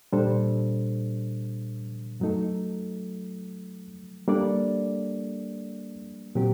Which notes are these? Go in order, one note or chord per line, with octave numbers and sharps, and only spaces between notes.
A#2 G3 D4 A4 C5
F#2 F#3 A3 D#4 A4
G3 A#3 D4 A4 D5
A#2 F#3 C4 G4